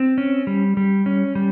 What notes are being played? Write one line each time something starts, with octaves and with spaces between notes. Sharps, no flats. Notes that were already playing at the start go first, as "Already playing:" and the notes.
Already playing: C4
C#4
G3
G3
C#4
G3